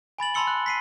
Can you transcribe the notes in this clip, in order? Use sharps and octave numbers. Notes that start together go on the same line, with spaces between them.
G#5 B5 A6 F#7
A5 B5 C6 E6 C#7 G7
F#6
B6 C7 D#7